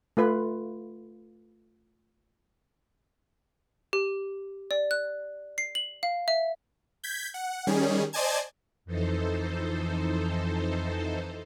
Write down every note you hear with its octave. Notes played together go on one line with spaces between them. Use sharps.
A3 F4 B4
G4
D5
F#6
C7
F#7
F5
E5
G6 G#6 B6
F#5
D#3 G3 C#4 G#4
C5 D5 D#5 G#5 A5 G#6
F2 E3 D#4 A4 C5